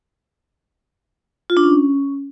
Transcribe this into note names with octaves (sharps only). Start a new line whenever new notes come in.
F4
D4
C#4